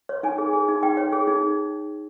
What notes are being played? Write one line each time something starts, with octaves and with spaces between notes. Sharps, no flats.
C#5
D#4 G#5
G#4
G#4
D#4
D#4 G5
C#5
G#4
D#4